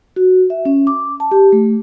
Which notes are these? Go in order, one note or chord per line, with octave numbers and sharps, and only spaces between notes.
F#4
E5
C#4
D6
A5
G4
A3